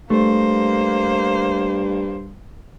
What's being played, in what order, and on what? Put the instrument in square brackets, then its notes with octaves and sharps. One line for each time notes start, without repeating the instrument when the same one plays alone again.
[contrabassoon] G2 [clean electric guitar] A3 [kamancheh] A#3 C5